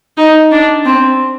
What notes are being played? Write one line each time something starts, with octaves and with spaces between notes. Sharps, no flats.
D#4
D4
C4